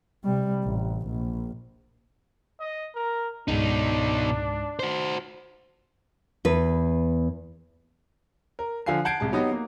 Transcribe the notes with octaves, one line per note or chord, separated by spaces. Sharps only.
C3 G3
A1
A#1
D#5
A#4
C#2 G#2 B2 D4 D#4
F#4 C5
E2 B4
A#4
D3 F3 F5 G#5 C7
F#5 A5 G6 G#6 C7 D7
C2 G#3 A5
F#3 B3 D#4 F#4 G4
A#3